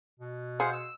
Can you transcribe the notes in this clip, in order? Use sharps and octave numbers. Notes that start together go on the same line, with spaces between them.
B2
G#4 C5 F5 F#5
E6